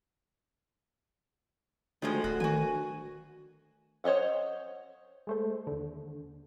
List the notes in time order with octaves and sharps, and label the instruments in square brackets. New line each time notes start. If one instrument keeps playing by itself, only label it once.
[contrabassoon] D2 [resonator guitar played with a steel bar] D#3 F3 G#3
[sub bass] D1 [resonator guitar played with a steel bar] F#4
[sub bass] D#3 [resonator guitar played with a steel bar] F#4 G#5
[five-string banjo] C5 C#5 D#5 E5 F#5
[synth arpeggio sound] G#3 A3 C5
D#2 D3